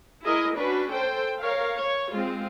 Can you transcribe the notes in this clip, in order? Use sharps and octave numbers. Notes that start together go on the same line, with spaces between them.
E4 G#4 A#4 D#5
C#4 D4 F#4 B4
A4 C5 G5
A#4 C#5 F5
C#5
G#3 C4 F4